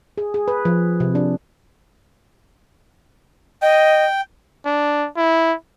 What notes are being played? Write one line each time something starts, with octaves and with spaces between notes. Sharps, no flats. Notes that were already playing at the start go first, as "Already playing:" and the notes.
G#4
G#4
B4
F3
C3
D4
D#5 G5
D4
E4